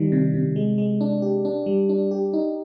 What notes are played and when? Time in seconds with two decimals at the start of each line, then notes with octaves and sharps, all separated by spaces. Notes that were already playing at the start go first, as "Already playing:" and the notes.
Already playing: D#3 G3
0.12 C3
0.34 C3
0.56 G#3
0.78 G#3
1.01 D4
1.22 G4
1.45 D4
1.66 G3
1.89 D4
2.11 G4
2.33 D#4